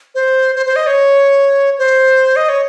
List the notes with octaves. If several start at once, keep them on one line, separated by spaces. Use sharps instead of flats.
C5
C5
C5
D#5
C#5
C5
D#5
C#5